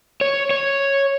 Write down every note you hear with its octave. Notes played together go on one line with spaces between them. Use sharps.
C#5
C#5